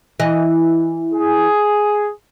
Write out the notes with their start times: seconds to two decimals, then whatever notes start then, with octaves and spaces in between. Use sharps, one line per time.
0.20 E3 D#5
1.13 G#4